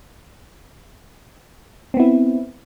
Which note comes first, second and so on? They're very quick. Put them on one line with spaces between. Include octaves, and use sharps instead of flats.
C4 B3 E4